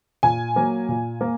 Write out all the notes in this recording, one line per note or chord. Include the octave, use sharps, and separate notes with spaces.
A#2 G#5
F#3 A#3
A#2
A#3